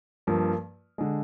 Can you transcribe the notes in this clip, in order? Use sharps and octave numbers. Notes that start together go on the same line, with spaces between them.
G2 F3 A#3
D3 G#3